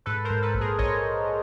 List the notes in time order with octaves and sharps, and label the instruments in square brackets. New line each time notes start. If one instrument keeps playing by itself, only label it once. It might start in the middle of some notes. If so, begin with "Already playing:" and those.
[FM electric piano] G#2 [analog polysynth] A4 B4
[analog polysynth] A#4 C5
[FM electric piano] G#2
[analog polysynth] A4 B4
[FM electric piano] A#1
[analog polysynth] G#4 A#4
[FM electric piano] A#1 [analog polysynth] C#5 D#5